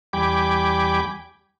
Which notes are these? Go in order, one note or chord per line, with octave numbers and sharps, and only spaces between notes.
E2 G3 G5 G#5 B5 D6